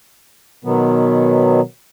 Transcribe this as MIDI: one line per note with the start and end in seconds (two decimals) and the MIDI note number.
0.65 1.61 47
0.65 1.61 51
0.65 1.61 54
0.65 1.61 59